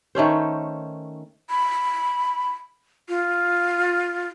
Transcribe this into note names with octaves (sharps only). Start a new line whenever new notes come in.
D#3 A3 C#4 C5
B5
F4